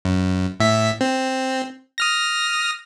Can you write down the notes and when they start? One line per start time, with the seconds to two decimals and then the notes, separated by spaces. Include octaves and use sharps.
0.05 F#2
0.60 A2 E5 B6
1.01 C4
1.98 D#6 F6 A#6